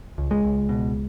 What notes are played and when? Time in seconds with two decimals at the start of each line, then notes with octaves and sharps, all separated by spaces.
0.18 C#2
0.31 G#3
0.44 C#2
0.69 B2